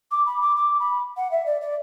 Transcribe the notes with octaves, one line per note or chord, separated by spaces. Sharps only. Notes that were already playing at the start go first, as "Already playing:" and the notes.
D6
B5
D6
D6
B5
F#5
E5
D5
D5